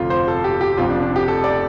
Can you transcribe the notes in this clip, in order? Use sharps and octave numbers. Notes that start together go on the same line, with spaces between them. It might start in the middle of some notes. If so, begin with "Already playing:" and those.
Already playing: F1 F2 D3 F4
C5
A4
G4
G4
F1 F2 F3 F4
D4
D4
G4
A4
D5